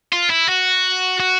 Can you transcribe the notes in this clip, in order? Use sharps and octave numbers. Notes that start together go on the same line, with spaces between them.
F4
E4
F#4
F#4